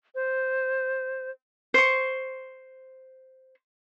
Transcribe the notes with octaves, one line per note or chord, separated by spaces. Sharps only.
C5
C5 C#6